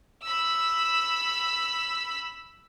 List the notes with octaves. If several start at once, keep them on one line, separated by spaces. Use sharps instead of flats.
B5 E6